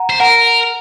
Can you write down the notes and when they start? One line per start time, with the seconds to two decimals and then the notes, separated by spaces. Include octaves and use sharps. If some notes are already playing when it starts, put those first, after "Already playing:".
Already playing: F#5 A#5
0.10 C5
0.20 A#4 F#5 A#5